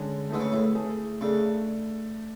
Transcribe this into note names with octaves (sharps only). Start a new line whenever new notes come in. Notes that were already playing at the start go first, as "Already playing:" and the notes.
Already playing: D3 G#3 C#4
D3 A3 E4 G#4 B4
C#3
A2
A3 E4 G#4
C#3 A3 D4 A4